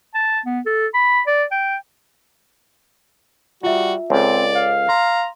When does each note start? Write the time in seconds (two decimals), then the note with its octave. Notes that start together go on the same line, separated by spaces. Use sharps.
0.14 A5
0.46 B3
0.66 A4
0.94 B5
1.27 D5
1.51 G5
3.63 G3 F4 F#4 E5
4.10 C#2 C4 A4 C#5 D5
4.55 F5
4.89 A#5 C6